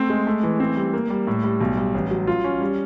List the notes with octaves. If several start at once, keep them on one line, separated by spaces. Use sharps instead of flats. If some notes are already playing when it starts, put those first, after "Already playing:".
Already playing: A3 C4
G#3
A3
E3
C4
G3
A#3
G3
A2
G3
B1
G3
A1
F#3
F4
C#4
G3